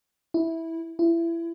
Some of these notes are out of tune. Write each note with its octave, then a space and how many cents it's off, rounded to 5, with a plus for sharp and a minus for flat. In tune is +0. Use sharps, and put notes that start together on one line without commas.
E4 -10
E4 +25